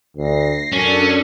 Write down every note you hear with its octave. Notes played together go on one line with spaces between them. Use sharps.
D2 A#6 C7
F#2 C#4 D4 A4